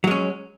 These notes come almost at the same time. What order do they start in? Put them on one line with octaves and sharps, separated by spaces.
F#3 G#3 C#4